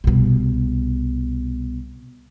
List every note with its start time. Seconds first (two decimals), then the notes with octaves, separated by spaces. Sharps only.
0.04 C2 B2